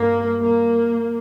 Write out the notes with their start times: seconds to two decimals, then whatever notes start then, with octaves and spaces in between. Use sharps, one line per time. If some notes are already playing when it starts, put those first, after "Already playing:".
Already playing: G2 A#3
0.42 A#3